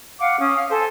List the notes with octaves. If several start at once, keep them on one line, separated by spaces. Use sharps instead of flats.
F5 F#5 D6
C#4 D6 D#6
F5
A4 C5 G#5